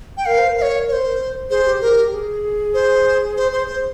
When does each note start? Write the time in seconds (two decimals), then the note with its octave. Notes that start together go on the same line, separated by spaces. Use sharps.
0.17 G5
0.26 A#4 F5
0.38 C5
0.50 A#4
0.57 F5
0.62 C#5
0.88 C#5
0.93 C5
1.50 G#4 C5
1.66 G4
1.81 G4 A#4
1.96 G4
2.13 G#4
2.74 C5
3.37 C5
3.52 C5
3.67 C5